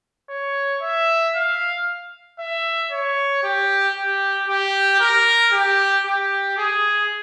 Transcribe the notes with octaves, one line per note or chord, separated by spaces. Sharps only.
C#5
E5
F5
E5
C#5
G4
G4
G4
A#4
G4
G4
G#4